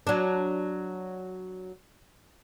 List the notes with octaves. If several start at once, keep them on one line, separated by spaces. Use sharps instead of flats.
F#3 D4